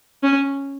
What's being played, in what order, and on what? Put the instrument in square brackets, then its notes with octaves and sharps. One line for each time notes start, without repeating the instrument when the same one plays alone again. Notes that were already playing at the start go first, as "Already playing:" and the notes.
[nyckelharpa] C#4